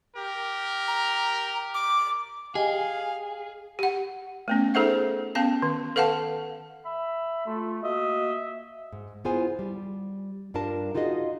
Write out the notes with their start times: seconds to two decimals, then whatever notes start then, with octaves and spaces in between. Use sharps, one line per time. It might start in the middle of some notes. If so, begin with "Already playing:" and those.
0.16 G4 A#4
0.88 A#5
1.74 D6
2.55 G4 G#4 D#5 F5 G5 G#5
3.79 G4 F#5
4.48 A3 B3 C#4
4.74 D#4 G#4 A4 C5 E5 F#5
5.35 B3 C#4 F5 A5
5.62 D#3
5.96 A4 B4 F5 F#5 A5
6.85 E5 B5
7.46 A3 F4
7.83 A#3 F#4 D#5 E5
8.92 G#2
9.25 B3 E4 F4 G#4 C5 G#5
9.59 G3
10.54 G2 G3 D4 F4 A#4 A5
10.95 D#4 F4 F#4 G#4 D#5